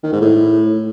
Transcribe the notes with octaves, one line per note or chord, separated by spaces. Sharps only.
D#3
G#2
A2